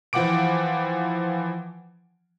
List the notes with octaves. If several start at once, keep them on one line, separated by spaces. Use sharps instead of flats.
E3 F3 F#5 G5 D6 D7